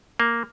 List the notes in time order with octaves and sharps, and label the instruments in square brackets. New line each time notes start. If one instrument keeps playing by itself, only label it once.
[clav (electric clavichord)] A#3